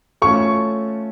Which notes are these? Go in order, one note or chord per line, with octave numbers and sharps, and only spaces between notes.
A3 C#4 F4 A4 C#6